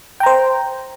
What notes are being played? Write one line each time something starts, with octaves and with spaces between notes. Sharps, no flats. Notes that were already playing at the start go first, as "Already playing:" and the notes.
C5 G5 A#5